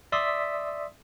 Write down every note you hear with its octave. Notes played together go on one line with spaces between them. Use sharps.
D5 E5 C6 D#6 E6 B6